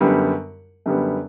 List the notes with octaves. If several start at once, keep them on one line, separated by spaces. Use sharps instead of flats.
F#2 D3 G3 B3
F#2 D3 G3 B3